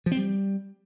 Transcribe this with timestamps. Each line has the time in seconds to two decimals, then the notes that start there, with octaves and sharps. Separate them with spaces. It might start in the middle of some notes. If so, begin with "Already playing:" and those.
0.06 F3
0.12 C4
0.17 G3